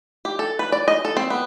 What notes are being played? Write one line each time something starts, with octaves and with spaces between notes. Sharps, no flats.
G4
A4
B4
D5
D#5
A4
C4
B3